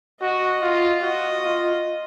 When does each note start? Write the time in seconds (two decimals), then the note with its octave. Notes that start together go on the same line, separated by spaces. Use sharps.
0.21 F#4 D#5
0.62 F4
1.02 F#4 D#5
1.42 F4